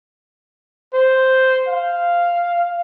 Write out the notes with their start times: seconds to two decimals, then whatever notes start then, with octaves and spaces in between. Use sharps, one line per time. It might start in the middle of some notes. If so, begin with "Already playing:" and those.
0.94 C5
1.68 F5